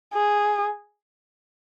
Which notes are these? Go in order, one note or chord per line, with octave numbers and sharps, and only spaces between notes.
G#4